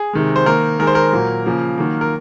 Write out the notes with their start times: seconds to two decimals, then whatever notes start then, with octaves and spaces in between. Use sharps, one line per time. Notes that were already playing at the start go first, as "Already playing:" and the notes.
Already playing: G#4
0.13 C3 D#3 G#3
0.36 C5
0.46 D#3 A#3 A#4
0.79 D#3 G#3 A#4
0.87 C5
0.95 A#4
1.12 A#2 F#3 A#3
1.46 C#3 F3 A#3
1.78 D#3 F#3 A#3
2.01 A#4